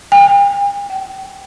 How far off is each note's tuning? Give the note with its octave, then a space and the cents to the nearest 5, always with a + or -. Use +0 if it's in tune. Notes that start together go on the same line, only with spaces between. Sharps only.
G5 +45
G5 -35